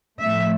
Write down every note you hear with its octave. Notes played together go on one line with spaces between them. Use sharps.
A2 F3 A3 E5